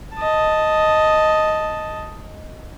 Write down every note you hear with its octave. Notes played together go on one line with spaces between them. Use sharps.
D#5 A5